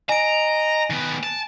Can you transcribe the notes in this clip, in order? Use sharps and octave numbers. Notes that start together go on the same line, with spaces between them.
D#5 G#5 A#5 D7
D#3 B3
A5